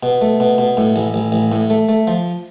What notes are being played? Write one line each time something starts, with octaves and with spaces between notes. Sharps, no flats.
B2
A3
B2
B2
A2
A1
A1
A1
A2
A3
A3
F3